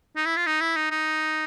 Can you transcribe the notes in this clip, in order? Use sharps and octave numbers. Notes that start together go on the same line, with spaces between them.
D#4
E4
F4
D#4
E4
D#4
D#4